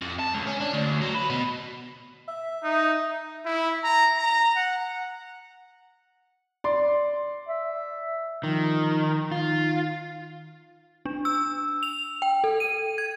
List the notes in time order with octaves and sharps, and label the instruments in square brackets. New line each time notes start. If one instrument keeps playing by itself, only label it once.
[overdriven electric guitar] F2
A5
C#2
C#4
D4
D2
F#3
B4
B2
[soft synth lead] E5
[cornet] D#4
[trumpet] E4
A#5
A#5
F#5
[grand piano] D5 C6
[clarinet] E5
[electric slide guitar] D#3 [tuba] F3
[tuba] D#3 [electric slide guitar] F4
[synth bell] D4
E6
F7
G5
A4
D#7
G#6